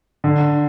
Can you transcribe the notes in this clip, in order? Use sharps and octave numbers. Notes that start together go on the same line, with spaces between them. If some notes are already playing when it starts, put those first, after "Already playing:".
D3